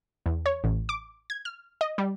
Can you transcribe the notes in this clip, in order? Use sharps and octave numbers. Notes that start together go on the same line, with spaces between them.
E2
C#5
A1
D6
G#6
F6
D#5
G3